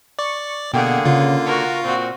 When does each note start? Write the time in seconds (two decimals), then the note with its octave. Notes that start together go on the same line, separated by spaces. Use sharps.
0.19 D5 C#6
0.74 B2 D3 A#3 G#4 F#5 G5
1.05 C#3 F4
1.46 F#4 A#4 C#6
1.84 A#2 C4 F#4